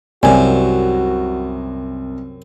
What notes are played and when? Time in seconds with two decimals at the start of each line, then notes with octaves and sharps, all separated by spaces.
0.23 C2 F#2 C3 F#4 D5 G#5